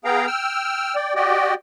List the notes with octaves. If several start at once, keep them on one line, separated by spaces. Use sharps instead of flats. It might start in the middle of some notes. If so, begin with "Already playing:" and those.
B3 G#4 F5 G5 A#5
G5 E6 F6
D5 G5
F#4 G4 D5 D#5 G5